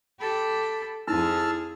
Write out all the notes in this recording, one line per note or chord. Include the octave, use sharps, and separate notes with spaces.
G4 A4 B5
F2 D#4 E4 G#4 A5 E6 F6